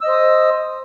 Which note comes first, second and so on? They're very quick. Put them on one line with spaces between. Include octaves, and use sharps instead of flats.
E6 D#5 C5 D#6